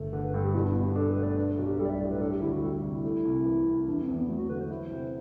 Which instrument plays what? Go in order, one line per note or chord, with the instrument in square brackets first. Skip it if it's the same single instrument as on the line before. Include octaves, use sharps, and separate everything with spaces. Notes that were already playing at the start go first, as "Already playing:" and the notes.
Already playing: [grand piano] G1 A3
[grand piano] D3 [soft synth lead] B4
[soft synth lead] B4
[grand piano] G2 [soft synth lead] A4
[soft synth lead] G4
[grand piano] B2 [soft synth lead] E4
[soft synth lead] D4
[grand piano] B2 [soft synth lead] B3
[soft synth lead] G4
[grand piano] D4 [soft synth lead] A4
[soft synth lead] B4
[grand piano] A3
[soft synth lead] D5
[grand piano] D4 [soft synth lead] B4
[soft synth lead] A4
[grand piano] B1 [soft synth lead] F#4
[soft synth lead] G4
[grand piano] G3 [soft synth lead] A4
[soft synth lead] D5
E5
[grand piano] A2 [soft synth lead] D5
[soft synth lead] B4
[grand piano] D4 [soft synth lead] A4
[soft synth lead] G4
[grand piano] D2 [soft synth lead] E4
[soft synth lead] F#4
[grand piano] G3 [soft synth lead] A4
[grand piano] C3 [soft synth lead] F#4
[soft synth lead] E4
[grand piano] A3
C2
E3
C3
[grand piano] E2 [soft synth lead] D4
[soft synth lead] C4
[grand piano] E2
[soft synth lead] B3
[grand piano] F#3 [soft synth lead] A3
[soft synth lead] F#4
[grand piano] D3 [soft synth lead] B4
[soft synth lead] C5
[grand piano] E4
C3